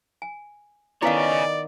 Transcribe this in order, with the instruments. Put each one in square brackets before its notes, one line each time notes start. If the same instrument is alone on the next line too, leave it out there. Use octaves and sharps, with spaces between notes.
[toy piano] G#5
[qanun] D#3 B3 [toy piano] E4 B4 F5 [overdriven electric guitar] G#4 C#5 [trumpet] D5